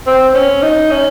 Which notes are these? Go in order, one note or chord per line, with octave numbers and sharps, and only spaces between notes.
C4
C#4
D#4
C#4